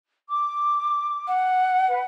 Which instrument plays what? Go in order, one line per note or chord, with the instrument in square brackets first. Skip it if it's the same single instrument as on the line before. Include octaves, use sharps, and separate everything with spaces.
[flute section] D6
[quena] F#5
[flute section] B4